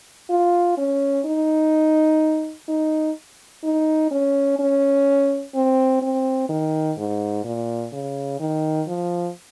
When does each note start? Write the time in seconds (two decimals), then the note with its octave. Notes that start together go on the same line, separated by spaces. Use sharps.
0.30 F4
0.78 C#4
1.26 D#4
2.68 D#4
3.64 D#4
4.11 C#4
4.59 C#4
5.55 C4
6.02 C4
6.49 D#3
6.98 G#2
7.44 A#2
7.93 C#3
8.40 D#3
8.88 F3